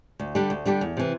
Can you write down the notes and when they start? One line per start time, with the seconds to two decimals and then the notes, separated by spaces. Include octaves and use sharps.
0.19 D2
0.35 D3 G3 D4 G4
0.50 D2
0.65 D3 G3 D4 G4
0.81 E2
0.97 C3 E3